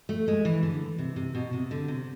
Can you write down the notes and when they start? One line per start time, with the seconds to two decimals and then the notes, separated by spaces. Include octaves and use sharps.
0.09 A3
0.28 G#3
0.45 E3
0.63 D3
0.98 C3
1.16 C3
1.35 B2
1.53 C3
1.71 D3
1.88 C3